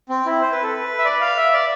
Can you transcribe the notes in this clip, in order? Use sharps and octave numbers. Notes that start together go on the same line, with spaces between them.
C4
E4
C5
B4
A4
B4
E5
D5
F5
E5
D5